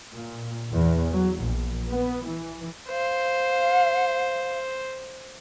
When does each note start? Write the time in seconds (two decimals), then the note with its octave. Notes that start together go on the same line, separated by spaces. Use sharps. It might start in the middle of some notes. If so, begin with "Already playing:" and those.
0.12 A#2
0.72 E2
1.11 F#3
1.41 A#1
1.90 B3
2.27 E3
2.89 C5 F5